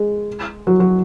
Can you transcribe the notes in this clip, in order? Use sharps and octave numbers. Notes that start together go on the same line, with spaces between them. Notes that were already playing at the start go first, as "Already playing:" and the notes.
Already playing: G#3
F#3
F#3